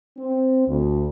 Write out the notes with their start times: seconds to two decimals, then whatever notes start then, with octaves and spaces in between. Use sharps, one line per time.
0.18 C4
0.68 D2